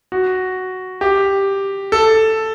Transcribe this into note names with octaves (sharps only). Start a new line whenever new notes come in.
F#4
G4
A4